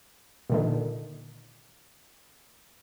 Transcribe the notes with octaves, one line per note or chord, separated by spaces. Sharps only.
A#2 D3 D#3